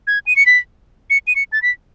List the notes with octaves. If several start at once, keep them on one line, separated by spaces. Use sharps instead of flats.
G#6
D#7
C#7
B6
C#7
D#7
C#7
A6
B6